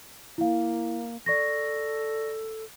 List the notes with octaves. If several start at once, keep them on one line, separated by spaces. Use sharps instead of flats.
A#3 E4 F5
A4 D5 C#6 A#6